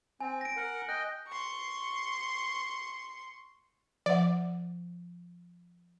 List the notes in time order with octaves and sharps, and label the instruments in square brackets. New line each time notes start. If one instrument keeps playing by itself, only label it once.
[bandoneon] C4 [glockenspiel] G#5
[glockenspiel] A#6 D7
[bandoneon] A#4 F#5
[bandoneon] D#5 G5 [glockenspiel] F#6
[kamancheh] C6 C#6
[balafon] F3 E5 F#5 [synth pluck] D5